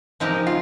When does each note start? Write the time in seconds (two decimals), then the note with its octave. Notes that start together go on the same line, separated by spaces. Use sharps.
0.20 F3 G#3 C4 D#4 G4 A#4
0.47 F4